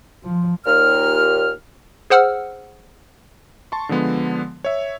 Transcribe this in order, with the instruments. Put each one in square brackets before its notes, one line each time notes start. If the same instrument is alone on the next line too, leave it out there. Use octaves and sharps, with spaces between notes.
[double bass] F3
[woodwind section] D#2 A#2 F6
[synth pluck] G#4 C5 F#5 E6 F6
[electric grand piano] A5 C6 C#6
D3 F3 G#3 B3
C#5 E5